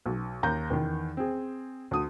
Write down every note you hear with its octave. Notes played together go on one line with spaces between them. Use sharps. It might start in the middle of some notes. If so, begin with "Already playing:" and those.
B1
D#2 A#5 G6
E2 D#3
C4 G#4
D2 D#6